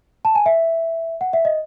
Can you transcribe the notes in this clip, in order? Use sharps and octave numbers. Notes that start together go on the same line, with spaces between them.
A5
G#5
E5
F#5
E5
D#5